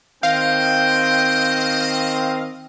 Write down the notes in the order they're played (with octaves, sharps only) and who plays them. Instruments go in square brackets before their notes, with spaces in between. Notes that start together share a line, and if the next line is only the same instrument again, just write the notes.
[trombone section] D#3 C4 [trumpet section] D#5 [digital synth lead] F5 [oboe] G5